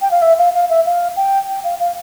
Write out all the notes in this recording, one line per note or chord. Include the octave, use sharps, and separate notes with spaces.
G5
F5
E5
F5
F5
E5
F5
G5
G5
F5
F5